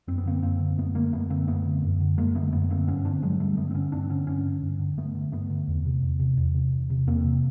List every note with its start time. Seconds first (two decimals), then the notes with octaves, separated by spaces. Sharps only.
0.07 F#2 C4
0.18 B3
0.25 D3 A#3 C4
0.42 F#2 A#3 C4
0.60 D3
0.78 F#2 A3 B3
0.95 D3 G#3 A#3
1.13 F#2 A3 B3
1.30 D3 A#3 C4
1.48 F#2 A3 B3
1.65 D3
1.83 F#2
2.00 D3
2.17 F#2 G#3 A#3
2.35 D3 A3 B3
2.52 F#2 A3 B3
2.70 D3 A#3 C4
2.87 G2 B3 C#4
3.05 D3 C4 D4
3.23 G2 F#3 G#3
3.39 D3 G3 A3
3.57 G2 A3 B3
3.71 C4
3.74 D3 B3 C#4
3.92 G2 C4 D4
4.10 D3 B3 C#4
4.27 G2 B3 C#4
4.45 D3
4.62 G2
4.79 D3
4.97 G2 A3 B3
5.15 D3
5.32 G2 A3 B3
5.50 D3
5.68 E2
5.85 C3
6.02 E2
6.19 C3
6.37 E2
6.55 C3
6.72 E2
6.90 C3
7.07 E2 A#3 C4
7.24 C3